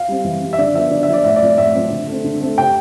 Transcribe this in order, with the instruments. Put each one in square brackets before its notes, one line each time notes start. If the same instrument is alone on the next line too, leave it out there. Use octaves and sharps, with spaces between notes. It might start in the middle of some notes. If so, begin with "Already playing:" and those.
Already playing: [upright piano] F5
G3 C4
E3
G3 C4
E5
D3 D5
F3 B3 E5
D3 D5
E5
F3 B3 D5
A2 E5
D5
F3 C4
A2 E5
F3 C4
D3
A3 C4
D3
A3 C4
C3 G5